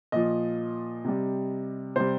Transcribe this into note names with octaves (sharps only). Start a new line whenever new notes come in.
A#2 F3 D#5
C3 G3
C3 G3 C5